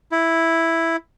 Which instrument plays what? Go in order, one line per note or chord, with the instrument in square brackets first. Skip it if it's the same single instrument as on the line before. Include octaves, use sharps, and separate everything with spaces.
[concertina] E4